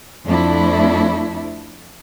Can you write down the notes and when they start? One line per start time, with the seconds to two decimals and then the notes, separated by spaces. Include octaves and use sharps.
0.25 F2 F3 A3 D4 E4